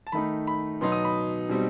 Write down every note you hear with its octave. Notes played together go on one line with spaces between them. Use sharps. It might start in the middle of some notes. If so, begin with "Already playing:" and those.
A5
D#3 A3 D#4 B5
B5
B2 F#3 B3 D#4 C6
D#6
B5
B2 G3 C4 D#4